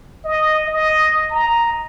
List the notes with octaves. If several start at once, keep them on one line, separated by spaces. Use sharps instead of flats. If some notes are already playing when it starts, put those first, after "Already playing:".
D#5
D#5
A#5